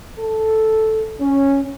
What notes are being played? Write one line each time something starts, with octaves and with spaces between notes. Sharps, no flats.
A4
C#4